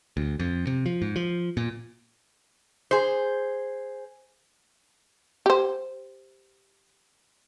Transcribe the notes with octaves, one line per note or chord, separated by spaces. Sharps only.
D2
F2
C3
F3
G#2
F3
A#2
G#4 C5
G4 C5